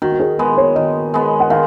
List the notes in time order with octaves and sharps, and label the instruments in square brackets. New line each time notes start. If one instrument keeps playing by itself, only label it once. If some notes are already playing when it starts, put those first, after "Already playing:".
[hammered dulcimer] D#3 [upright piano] F#4
[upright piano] F#4
G#4
[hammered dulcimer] G#3 B3 [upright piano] B4
[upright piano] C#5
[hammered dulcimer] D#3 [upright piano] D#5
[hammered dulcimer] G#3 B3
[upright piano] F#5
[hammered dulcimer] D#3 [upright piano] F5